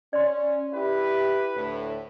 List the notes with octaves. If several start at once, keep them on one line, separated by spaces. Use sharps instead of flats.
C#4 D5 C6
E4 G4 B4
D2 A2